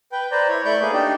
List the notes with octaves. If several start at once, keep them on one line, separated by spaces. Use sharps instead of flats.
B4 G5
B4 C5 D5 A#5
E4 C#5
A3 E4 D5 B5 C#6 G6
A#3 G#4 B4
D4 D#4 G4 D5